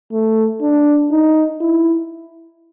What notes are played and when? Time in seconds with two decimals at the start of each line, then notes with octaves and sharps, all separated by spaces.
0.12 A3
0.61 D4
1.11 D#4
1.60 E4